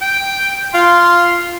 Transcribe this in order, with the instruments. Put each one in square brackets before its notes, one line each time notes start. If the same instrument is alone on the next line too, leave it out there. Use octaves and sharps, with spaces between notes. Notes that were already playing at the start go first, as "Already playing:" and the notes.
[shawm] G5
[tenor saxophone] F4 [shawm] C6